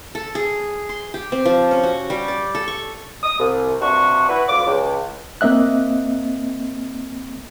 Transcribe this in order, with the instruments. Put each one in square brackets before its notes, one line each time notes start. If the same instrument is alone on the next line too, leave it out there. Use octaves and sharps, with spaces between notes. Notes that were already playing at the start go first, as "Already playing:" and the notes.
[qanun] A4
G#4
C6
G4
C4
F3
C#4
F#4
G3
D5
A4
C#6
[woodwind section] D#6
C2
G2 C3 D4 F#4 C#6
E4 F#4 B4
D2 F4 D6
C#2
[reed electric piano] A#3 C4 D#5 E5 F#6